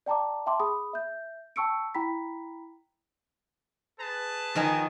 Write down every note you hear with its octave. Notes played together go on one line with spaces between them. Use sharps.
D5 G5 A5 A#5 D6
E5 G5 A5 C6 D6
G#4 B5 D#6
E5 G6
G5 A5 C#6 E6 C#7 D7
E4 G5 A#5 B5 B6
G#4 B4 A5
D#3 F3 D#4 G#5